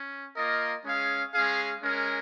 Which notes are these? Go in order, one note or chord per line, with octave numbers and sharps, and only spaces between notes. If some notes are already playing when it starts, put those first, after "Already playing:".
Already playing: C#4
A#3 F4 A#4 D#5
G#3 C#4 G#4 F5
G#3 C#4 G#4 F5
G#3 C#4 A#4